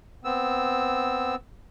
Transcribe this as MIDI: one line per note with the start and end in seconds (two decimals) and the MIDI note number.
0.25 1.35 59
0.25 1.35 60
0.25 1.35 88